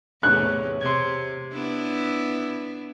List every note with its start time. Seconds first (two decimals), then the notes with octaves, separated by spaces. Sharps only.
0.23 E2 A2 C3 C#5 F#6
0.81 C3 C6 G#6
1.53 B3 D4 E4